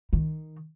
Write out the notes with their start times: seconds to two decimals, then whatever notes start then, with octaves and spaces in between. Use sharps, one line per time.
0.13 D#3